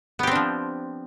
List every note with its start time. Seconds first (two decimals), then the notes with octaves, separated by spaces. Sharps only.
0.19 B3
0.23 G4
0.27 C4
0.31 D4
0.35 F3